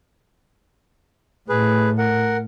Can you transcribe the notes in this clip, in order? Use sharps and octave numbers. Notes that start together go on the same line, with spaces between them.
A2 G#4 B4
A#4 F#5